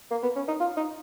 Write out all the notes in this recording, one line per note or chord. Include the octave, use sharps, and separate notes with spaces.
A#3
B3
C#4
D#4
F4
D#4